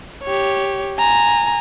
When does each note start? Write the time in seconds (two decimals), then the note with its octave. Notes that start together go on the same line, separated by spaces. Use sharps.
0.24 G4 C#5
0.98 G#5 A#5